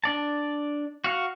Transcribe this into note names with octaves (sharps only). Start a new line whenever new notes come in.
D4 D5 A5
F#4 F5 F#5